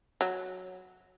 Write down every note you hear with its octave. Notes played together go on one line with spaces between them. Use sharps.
F#3